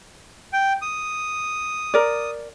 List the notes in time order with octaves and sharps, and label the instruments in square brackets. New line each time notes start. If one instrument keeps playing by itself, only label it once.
[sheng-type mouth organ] G5
D#6
[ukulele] A#4 D5